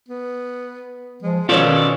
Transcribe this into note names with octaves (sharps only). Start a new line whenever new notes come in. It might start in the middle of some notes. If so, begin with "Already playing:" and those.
B3
F3 G#3
B2 D#3 C#4 F4 A4 C#5 D5